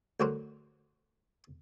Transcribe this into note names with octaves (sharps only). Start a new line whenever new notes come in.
D2 D3 F#3 F#4 A#4 C5